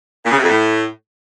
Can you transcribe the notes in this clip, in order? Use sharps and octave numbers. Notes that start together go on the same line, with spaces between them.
A#2
C#3
C3
F2
A2